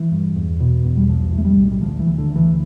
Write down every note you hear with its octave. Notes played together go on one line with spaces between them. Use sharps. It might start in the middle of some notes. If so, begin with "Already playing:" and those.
Already playing: E3
G2
E2
B2
E2
G3
B1 F3
A2
A3
G3
B1
G3
D2 F3
E3
D2
D3
D2
E3